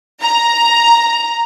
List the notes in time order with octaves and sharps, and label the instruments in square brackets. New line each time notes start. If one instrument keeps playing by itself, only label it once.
[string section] A#5